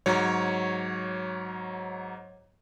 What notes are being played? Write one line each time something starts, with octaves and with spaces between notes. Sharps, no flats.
G#2 F#3 C#5